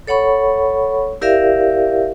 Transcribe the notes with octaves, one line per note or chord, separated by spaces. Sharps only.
A4 C#5 F#5 B5 C#6
E4 G4 A#4 D5 E5 F5